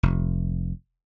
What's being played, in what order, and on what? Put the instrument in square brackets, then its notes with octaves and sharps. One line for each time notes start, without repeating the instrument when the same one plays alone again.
[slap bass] F1